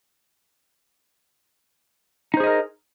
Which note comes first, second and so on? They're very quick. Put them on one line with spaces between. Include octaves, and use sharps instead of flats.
D#4 C5 G#4 D#5 A#4